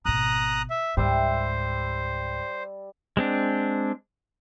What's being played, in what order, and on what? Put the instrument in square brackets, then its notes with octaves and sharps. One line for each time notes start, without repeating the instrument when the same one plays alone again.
[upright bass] G#1 B2 [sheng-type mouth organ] A#5 D#6 F#6
[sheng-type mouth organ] E5
[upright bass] C#2 G#2 [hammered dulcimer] G3 E5 [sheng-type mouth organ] C5
[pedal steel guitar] G#3 C4 D4